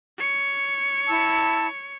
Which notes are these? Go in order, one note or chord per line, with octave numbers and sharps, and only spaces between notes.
C#5 C#7
E4 A5 E6